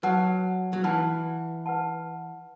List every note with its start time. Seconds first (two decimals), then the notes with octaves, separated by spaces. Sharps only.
0.03 F#3 B4 F#5 A5
0.73 F#3
0.83 E3 B4 F#5 A5
1.66 B4 F#5 A5